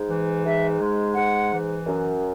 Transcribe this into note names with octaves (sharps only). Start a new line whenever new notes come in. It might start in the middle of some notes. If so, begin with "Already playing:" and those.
Already playing: G#2
E3
G#2 E5
G#3
G#2 F#5
E3
F#2